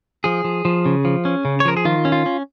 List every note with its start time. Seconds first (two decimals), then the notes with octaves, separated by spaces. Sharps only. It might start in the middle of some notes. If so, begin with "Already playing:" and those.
0.24 F3 G#4
0.44 F3
0.65 F3
0.86 C#3
1.05 F3
1.25 C#4
1.45 C#3
1.60 C#5
1.65 F3 A#4
1.77 G#4
1.85 D#3 F4
2.05 C#4
2.12 F4
2.26 C#4